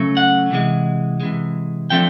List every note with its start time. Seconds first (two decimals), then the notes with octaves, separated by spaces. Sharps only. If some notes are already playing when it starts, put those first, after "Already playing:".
Already playing: C#3 F#3 A3
0.17 F#5
0.51 C3 E3 G#3
1.20 C3 E3 G#3
1.90 D3 F3 A3 C4 G5